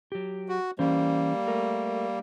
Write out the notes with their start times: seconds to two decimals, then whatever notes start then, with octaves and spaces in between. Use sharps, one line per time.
0.12 F#3 G4
0.49 F#4
0.79 E3 G3 A#3 C#4 C5
1.48 A3 A#4